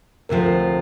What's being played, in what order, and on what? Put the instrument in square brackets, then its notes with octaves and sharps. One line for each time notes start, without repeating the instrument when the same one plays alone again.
[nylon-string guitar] D2 C3 F3 [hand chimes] A#4
[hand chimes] A4
A#4